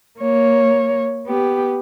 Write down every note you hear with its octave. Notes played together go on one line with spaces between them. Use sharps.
A#3 C#5
B3 G4